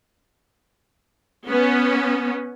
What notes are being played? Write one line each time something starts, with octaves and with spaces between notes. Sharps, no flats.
B3 C#4